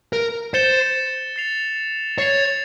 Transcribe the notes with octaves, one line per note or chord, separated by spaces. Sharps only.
A#4
C5 A6 C#7 E7 G7
A6 C7 F7
C#5 A6 C7 F7